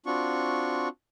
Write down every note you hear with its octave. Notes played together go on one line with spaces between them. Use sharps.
C4 D4 F4 F#4 C#6